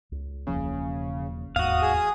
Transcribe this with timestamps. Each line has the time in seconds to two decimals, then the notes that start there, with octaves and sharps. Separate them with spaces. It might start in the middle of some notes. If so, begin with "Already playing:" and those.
0.12 C#2
0.47 E1 C#3 F3 A#3
1.56 E1 D#2 G#2 F#4 F5 D#6
1.82 G#4